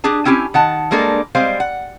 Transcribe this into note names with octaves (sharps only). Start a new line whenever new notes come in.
D4 G4 G#4 A5
C4 C#4 E4 G4 G#5
D#3 F#5 A5
G3 G#3 A#3 D4 A4
G3 G#3 C4 C5 F5
F#5